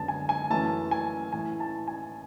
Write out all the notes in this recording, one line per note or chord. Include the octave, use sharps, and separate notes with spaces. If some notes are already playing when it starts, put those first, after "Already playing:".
Already playing: F#2 D3 G#3 B3 A5
G#5
G#5
F#2 E3 A3 A5
G#5
A2 E3 A3 G#5
A5
G#5